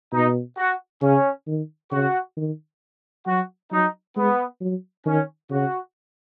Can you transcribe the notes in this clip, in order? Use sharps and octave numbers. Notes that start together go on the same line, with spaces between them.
B2 D#4
F#4
C#3 C#4
D#3
C#3 F#4
D#3
F#3 F#4
F#3 D#4
G#3 B3
F#3
D#3 C#4
C#3 F#4